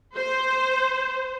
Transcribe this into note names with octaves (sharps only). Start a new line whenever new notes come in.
C5